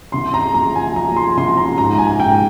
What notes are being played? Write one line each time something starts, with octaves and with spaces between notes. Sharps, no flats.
C2 C6
A#5
F3 A#5
G#5
F3 A#5
C6
C2 C6
A#5
G#2 A#5
G#5
G#2 G5